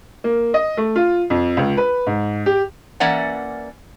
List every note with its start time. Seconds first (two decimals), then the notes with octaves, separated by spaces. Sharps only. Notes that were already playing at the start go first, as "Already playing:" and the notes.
0.24 A#3
0.54 D#5
0.77 A3
0.96 F4
1.30 F2
1.57 C#2
1.77 B4
2.07 G#2
2.46 G4
3.00 E3 A#3 C#4 D5 E5 F#5